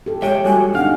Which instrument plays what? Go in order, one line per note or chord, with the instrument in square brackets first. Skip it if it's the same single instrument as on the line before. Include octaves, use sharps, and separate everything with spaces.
[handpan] G4 A4
[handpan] G#3 [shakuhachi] C#5 [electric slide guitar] E5 G5
[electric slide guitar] G3 F#4 [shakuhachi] G#5
[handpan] C4 D4 D#4 [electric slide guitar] F5 [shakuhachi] F#5